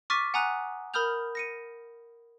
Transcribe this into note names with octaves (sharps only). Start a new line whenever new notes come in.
C#6 D6 F6 A6 B6 D#7
F#5 G#5 A#5 D#6 F#6
A#4 B5 D#6 F6 G6 F7
A#6 C#7 D#7